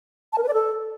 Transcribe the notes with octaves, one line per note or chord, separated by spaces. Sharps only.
A5
A#4
B4
D5
A4